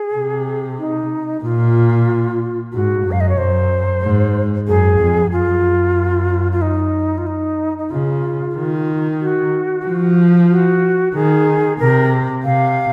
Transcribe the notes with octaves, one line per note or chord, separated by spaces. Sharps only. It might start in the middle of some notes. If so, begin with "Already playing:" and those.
Already playing: G#4
C3
D#4
A#2 F4
G#2 F#4
F#2
F5
D#5
C#5
F#2 C5
G#2
F#2 G#4
F2
F#2 F4
F4
D#4
F4
D#4
D#4
C#3 F4
D#3
F#4
F3
F#4
D#3 G#4
C3 A#4
C3 F5